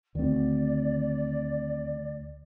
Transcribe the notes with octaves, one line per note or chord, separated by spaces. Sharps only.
D2 D#3 C4 D5